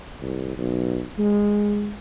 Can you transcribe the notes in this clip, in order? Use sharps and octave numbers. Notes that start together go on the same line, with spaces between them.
C2
B1
G#3